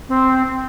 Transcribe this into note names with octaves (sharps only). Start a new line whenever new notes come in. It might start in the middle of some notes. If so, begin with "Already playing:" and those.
C4